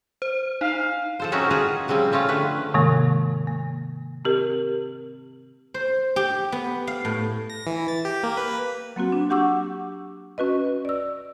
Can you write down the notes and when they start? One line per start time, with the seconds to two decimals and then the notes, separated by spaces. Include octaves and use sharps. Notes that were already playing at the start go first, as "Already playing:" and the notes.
0.22 C5
0.61 D#4 F5
1.20 F3 A4 C5
1.32 C4 C#4 D#4 E4 F#4 A#4
1.51 F4 F#4 G#4 B4 A#5
1.88 C#3 F3 G3 C4 G#5
2.12 A3 C4 C#4 F4 F5
2.29 D3 F3 A3 B4
2.74 G#2 C3 D#3 G#3 A#3
3.47 A#3
4.25 C4 G4 A#4
5.74 C5
6.16 G4
6.52 B3
6.87 F5
7.05 A2
7.50 A#6
7.67 E3
7.88 A6
8.05 G4
8.23 A#3
8.37 B4
8.96 F#3 A#3 C4 F#4
9.12 D4
9.30 G4 F#5 C#6 D6 E6 G6
10.38 C#4 F#4 B4 D#5
10.85 D5 E6